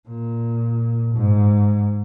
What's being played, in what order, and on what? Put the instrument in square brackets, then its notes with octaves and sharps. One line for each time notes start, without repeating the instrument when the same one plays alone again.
[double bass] A#2
G#2